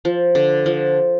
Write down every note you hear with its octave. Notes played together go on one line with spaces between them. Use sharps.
F3
D3
F3